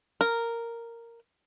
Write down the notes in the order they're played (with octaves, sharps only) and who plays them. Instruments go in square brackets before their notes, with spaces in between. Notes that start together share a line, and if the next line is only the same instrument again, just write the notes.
[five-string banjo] A#4